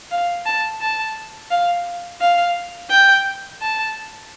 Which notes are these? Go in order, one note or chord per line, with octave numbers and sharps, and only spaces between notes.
F5
A5
A5
F5
F5
G5
A5